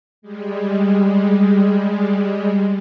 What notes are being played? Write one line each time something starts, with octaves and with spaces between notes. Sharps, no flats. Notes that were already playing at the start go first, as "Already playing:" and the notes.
G3 G#3